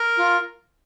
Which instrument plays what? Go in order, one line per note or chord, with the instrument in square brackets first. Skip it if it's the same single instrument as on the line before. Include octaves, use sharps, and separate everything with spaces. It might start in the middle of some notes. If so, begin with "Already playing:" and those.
Already playing: [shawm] A#4
[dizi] F4